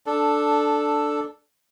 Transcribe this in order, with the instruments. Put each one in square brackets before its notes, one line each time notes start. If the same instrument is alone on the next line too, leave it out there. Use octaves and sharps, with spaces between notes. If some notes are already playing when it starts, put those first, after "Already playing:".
[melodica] D4 A4